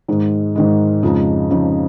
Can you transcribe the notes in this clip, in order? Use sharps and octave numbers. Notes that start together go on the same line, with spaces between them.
G#2 D#3 G#3
G#2 D#3 G#3
F2 C#3 F3 G#3 D#4
F2 C#3 F3 G#3 D#4